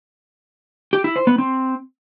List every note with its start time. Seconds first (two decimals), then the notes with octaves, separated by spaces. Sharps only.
0.93 G4
1.04 E4
1.16 C5
1.27 B3
1.38 C4